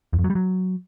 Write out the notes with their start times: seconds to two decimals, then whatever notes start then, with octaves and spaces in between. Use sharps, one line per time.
0.13 E2
0.19 F2
0.24 F#3
0.30 G3
0.35 F#3